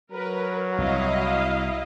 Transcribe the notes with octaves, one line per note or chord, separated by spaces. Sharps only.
F#3 A#4 B4
C2 E4 D#5 F5